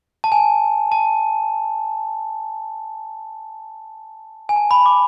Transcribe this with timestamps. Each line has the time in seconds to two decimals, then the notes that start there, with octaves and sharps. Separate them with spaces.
0.24 A5
0.32 G#5
0.92 A5
4.49 G#5
4.56 A5
4.71 B5
4.86 D6